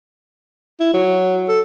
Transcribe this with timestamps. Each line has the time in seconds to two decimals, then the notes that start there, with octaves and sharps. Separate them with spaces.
0.80 E4
0.94 F#3
1.49 A4